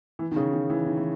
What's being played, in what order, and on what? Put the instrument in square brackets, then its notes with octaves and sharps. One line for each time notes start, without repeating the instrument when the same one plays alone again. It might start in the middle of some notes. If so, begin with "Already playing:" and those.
[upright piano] E3
D#3
C#3
D#3
E3
D#3
E3